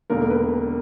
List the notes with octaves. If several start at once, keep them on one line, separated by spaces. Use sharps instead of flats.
E1 D#2 D3 A#4
A#4
B4